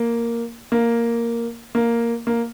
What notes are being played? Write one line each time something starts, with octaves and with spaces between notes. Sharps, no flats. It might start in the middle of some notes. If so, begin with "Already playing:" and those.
Already playing: A#3
A#3
A#3
A#3